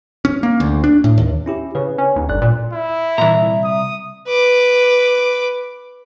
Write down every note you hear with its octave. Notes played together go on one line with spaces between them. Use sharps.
C#4
A#3
D2
D4
A2
D#2
C#4 E4 G4
C#3 B4
C#4
D#2
G1 D5 F#6
A#2
E4
C2 A#2 E3 E5 A#5
D#6
B4 D6